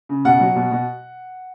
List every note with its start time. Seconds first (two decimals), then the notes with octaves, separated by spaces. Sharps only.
0.09 C#3
0.25 B2 F#5
0.40 F#3
0.56 B2
0.71 B2